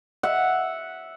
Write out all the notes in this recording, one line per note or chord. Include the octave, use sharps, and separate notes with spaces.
E5 F#5